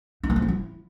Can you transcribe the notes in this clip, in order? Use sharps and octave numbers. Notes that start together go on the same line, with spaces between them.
D#4
B3
C4
F3
E4